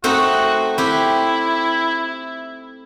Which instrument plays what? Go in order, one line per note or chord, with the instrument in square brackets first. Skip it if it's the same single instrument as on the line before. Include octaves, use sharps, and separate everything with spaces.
[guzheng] A3 C4 D#4 [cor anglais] F#4
[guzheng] C4 G4 [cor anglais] E4